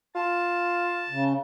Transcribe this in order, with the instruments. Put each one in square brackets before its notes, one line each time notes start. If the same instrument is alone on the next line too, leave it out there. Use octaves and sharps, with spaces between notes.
[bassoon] F4 [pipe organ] A5
[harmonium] C#3